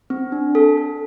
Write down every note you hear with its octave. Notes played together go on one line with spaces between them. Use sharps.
C4
D4
A4
A4